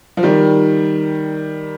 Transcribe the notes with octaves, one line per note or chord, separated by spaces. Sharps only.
F3
D#3 G3